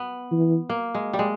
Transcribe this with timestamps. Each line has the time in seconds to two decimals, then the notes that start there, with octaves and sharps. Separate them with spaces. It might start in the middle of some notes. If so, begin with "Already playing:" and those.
Already playing: B3
0.31 E3
0.70 A#3
0.95 G#3
1.13 G3
1.19 G#3